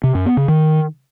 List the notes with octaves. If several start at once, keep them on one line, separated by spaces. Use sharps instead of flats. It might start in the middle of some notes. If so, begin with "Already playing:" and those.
C3
F#2
B3
C#3
D#3